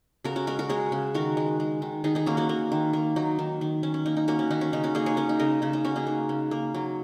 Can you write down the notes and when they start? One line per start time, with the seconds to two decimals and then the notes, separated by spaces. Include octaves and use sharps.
0.24 C#3 F#4 A#4
0.36 C#4 F#4
0.47 G#3 F#4 A#4
0.59 F#4 A#4
0.69 G#3 G#4 C#5
0.92 C#3
1.14 D#3 F#4 A#4
1.37 G#3
1.60 G#3
1.82 D#3
2.04 D#3 D#4 G#4
2.15 D#4 G#4
2.26 A#3 C#4 F#4
2.37 C#4 F#4
2.49 A#3
2.72 D#3
2.93 A#3
3.16 F#3 D#4
3.39 D#3
3.61 D#3
3.83 D#3 C#4
3.94 C#4
4.06 A#3 D#4
4.17 D#4
4.28 A#3 C#4 F#4
4.39 C#4
4.50 D#3 D#4
4.61 C#4
4.73 C#3 D#4
4.84 C#4 F#4
4.95 A#3 D#4 G#4
5.06 G#4 C#5
5.17 A#3 C#4
5.29 D#4
5.39 C#3 A#4 D#5
5.62 C#3 D#4
5.73 D#4
5.85 A#3 C#4 F#4
5.96 D#4 G#4
6.07 A#3
6.29 C#3
6.51 A#3
6.74 F#3